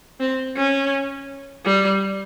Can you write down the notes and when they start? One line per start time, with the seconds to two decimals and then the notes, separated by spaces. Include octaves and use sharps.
0.20 C4
0.56 C#4
1.65 G3